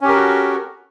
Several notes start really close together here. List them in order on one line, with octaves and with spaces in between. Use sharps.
C#4 G4 A#4 A4 F#4